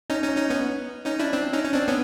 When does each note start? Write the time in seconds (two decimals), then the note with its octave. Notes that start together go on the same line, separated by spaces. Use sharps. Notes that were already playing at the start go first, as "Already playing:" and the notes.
0.10 C#4 D#4
0.23 C#4 D#4
0.37 C#4 D#4
0.50 B3 C#4
1.06 C#4 D#4
1.19 D4 E4
1.33 C4 D4
1.53 C#4 D#4
1.65 C#4
1.74 C4 D4
1.88 B3 C#4